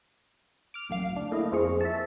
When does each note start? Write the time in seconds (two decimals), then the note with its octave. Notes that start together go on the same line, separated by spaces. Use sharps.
0.74 D6 F6
0.89 A#1 F#2 F5
1.13 D2 D4
1.31 A3 A#3 E4 D#5
1.52 F2 F3 C4 G#4 C#6
1.81 E5 A5